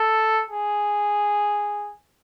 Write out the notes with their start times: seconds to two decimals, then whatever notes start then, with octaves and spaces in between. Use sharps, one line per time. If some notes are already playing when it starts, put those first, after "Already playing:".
Already playing: A4
0.50 G#4